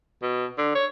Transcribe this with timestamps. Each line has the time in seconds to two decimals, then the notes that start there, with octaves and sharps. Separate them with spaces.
0.22 B2
0.58 D3
0.75 C#5